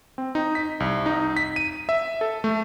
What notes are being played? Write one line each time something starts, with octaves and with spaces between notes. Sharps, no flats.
C4
D#4
B6
C2
D#4
B6
D#7
E5
A4
A3